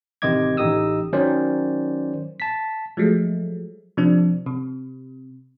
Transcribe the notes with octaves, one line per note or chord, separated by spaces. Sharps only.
A1 C3 D#3 D#5 D6 G#6
A1 D#4 G4 D#5 D#6 E6
D#3 F#3 C#4 C5 D5
A5 B6
F3 F#3 G#3 A3
C3 F3 D4
C3